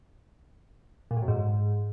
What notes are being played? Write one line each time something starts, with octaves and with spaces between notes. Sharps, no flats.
A#2
A2
F#2
G#2